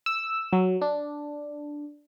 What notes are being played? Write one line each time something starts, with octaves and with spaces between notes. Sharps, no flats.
E6
F#3
D4